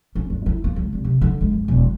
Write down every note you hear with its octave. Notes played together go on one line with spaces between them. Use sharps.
C#4
G2
E4
A#3
C#2
C2
C3
D3
G#3
F#2
E1
E3